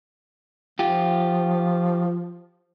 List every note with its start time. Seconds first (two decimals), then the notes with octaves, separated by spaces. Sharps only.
0.79 F3 F4 G4